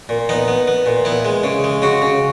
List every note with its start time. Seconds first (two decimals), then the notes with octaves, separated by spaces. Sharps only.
0.09 A#2
0.29 B3 D#4
0.48 B3
0.68 B3
0.86 A#2
1.05 B3 E4
1.25 G#3
1.44 C#3
1.64 G#3
1.82 C#3 F#4
2.02 C#3